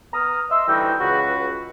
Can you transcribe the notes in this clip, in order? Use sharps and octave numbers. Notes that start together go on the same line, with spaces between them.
B3 A#5 D#6 F6
D#5 E5 C6 E6
D2 E3 G3 D#4 F#4 G5
C#2 F#4 B4